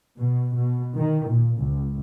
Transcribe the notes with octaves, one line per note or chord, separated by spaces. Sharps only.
B2
B2
D#3
A#2
C#2